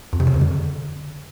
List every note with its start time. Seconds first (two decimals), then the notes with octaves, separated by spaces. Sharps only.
0.13 F2
0.20 C3
0.27 C#3
0.34 F2
0.41 D3